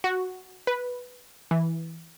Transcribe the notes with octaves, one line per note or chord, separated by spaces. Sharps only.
F#4
B4
E3